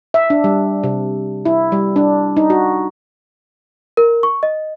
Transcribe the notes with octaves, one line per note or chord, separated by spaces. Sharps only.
E5
D4
G3
C3
E4
G3
D4
D#4
F#4
A#4
C#6
D#5